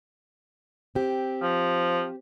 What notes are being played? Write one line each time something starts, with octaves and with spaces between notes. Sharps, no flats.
C4 G4
F3